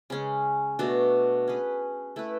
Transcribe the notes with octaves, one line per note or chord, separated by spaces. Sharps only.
C#3 G#3 C#4
B2 A3 D4 F#4
C#4 G#4 B4
A3 E4 B4